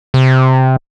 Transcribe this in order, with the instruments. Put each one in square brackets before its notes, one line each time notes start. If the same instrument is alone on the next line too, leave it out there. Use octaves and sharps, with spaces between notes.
[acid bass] C3